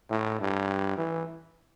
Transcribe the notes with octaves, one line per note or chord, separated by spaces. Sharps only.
A2
G2
E3